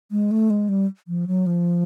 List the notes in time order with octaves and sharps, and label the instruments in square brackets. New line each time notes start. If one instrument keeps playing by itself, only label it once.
[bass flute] G#3
A3
G#3
G3
F3
F#3
F3